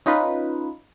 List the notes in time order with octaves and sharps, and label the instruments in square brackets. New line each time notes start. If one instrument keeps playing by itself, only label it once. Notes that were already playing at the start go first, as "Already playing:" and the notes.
[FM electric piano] C#4 D#4 F4 B4